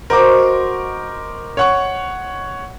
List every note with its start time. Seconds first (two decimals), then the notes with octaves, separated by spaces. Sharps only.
0.10 F#4 A#4 C5 D#5 D6
1.57 C#5 F#5 C#6